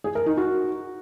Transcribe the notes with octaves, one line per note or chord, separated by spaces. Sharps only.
G#4
A#4
D#4
F#4